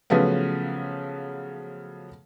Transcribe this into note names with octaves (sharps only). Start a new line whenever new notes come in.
C#3 F3 F#3 A3 B3